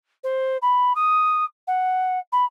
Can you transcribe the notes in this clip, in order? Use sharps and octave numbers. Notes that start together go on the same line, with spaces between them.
C5
B5
D#6
F#5
B5